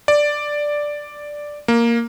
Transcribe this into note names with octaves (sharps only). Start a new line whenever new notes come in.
D5
A#3